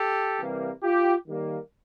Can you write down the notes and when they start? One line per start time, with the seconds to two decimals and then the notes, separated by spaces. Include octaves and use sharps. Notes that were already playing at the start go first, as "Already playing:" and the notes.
Already playing: G4 A4
0.40 C3 E3 G3 A#3
0.83 F4 G4
1.27 D#3 G3 A#3